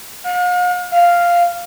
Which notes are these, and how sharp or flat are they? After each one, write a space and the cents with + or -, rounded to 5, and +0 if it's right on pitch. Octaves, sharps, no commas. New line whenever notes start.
F5 +45
F5 -5